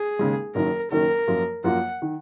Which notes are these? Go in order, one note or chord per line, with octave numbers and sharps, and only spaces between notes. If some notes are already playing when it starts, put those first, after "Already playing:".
Already playing: G#4
D#2 C#3 G#3
F#1 F#2 D#3 A#4
F#1 F#2 D#3 A#4
F#2 F3 A#3 F4
F#2 F3 A#3 F4 F#5
D#3